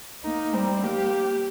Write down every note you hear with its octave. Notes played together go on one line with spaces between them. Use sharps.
A#3 D#4
G3 C4
A#3 G4